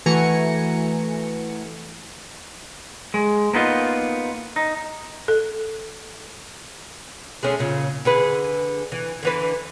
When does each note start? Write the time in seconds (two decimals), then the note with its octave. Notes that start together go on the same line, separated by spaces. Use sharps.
0.06 E3 A3 F#4 G#5 A#5 C#7
3.14 G#3
3.53 A#3 B3 D#4 F4
4.56 D#4
5.28 A4
7.43 G#3 A3 C#4
7.59 A#2 C#3
8.05 D3 G#4 B4
8.92 E3
9.23 D3 E3 B4